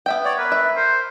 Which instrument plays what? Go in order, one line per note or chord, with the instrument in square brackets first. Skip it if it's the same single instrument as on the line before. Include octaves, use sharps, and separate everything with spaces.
[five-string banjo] B3 E5 G5
[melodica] C#5 D5
[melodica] A#4 [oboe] B4
[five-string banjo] E5
[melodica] A#4 [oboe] C5